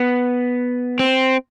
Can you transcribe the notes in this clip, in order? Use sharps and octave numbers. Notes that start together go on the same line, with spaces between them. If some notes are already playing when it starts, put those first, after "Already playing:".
Already playing: B3
C4